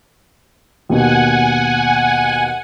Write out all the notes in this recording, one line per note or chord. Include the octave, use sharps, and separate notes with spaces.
D#2 B2 F#5 G#5